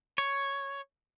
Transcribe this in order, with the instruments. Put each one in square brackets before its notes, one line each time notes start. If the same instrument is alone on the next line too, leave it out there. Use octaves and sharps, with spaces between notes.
[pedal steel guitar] C#5